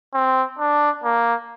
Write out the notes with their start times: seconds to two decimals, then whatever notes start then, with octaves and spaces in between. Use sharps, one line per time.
0.14 C4
0.59 D4
1.04 A#3